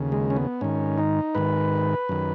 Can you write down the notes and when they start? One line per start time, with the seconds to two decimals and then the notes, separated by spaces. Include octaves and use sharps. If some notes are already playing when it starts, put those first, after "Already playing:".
Already playing: D#2 C#3
0.12 G#3
0.30 C#4
0.36 B3
0.61 G#2 D#3 C#4
0.98 D#4
1.35 G#2 D#3 B4
2.09 F#2 D#3